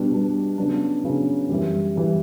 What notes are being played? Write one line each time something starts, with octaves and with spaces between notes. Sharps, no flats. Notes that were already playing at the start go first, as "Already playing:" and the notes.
Already playing: B2 G3 B3 D4
B2 G3 B3 D4
C#3 F#3 B3 D4
C#3 F#3 B3 D4
F#2 E3 G3
F#2 E3 G3